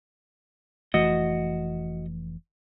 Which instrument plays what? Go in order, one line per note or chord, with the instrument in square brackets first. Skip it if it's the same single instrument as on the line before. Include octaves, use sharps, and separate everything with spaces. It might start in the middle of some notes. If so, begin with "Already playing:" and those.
[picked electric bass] F1 E3 A3 [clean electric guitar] F#4 D#5